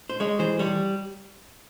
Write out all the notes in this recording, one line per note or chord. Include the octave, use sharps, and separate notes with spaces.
C5
G#3 C#5
E3 C5
G3 C#5